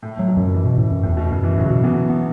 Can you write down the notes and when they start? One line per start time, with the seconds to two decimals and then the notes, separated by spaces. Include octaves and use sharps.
0.02 A2
0.17 A2 F#3
0.28 B2
0.37 F#2
0.46 C#3
0.54 E3
0.65 B2
0.78 A2
0.91 F#2
1.03 E2 A2
1.17 B2
1.30 F#2 C#3
1.43 E3
1.58 A2 F#3
1.65 C#3
1.70 B2
1.83 E3 B3
2.10 B3